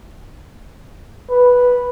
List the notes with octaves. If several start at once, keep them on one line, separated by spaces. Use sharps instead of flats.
B4